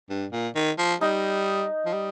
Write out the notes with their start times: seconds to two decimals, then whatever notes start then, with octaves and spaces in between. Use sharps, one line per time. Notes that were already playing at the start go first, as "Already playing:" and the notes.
0.10 G2
0.32 A#2
0.55 D#3
0.78 F3
1.01 G3 D#4
1.86 F3
1.93 G3